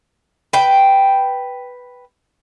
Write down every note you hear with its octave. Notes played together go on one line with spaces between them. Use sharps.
B4 G5